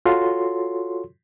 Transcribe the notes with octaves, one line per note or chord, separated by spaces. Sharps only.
F4 F#4 A4 C#5 C6